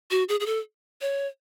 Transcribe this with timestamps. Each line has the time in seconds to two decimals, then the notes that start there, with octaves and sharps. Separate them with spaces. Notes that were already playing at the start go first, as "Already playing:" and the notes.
0.11 F#4
0.29 G#4
0.40 G#4
0.46 A4
1.01 C#5